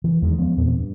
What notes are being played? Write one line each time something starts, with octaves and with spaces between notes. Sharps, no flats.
E3
E2 D#3 G#3
F3 G#3 B3 C#4
E2 A#2 B3 C4
G2